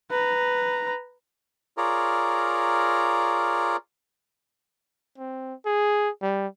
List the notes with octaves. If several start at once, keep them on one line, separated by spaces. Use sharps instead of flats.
B4 A#5
F4 G#4 A#4 C#5 D5 A#5
C4
G#4
G3